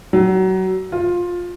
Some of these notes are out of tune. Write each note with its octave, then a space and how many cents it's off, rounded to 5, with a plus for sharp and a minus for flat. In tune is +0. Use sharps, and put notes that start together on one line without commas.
F#3 +25
F4 +15